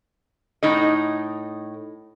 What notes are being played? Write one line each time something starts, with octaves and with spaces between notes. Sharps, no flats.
A2 D#4 D#5